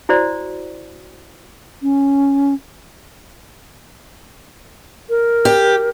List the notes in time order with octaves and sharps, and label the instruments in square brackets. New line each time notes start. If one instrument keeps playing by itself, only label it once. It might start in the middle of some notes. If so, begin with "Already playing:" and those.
[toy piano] E4 F#4 C5 D5
[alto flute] C#4
A#4
[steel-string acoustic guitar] G4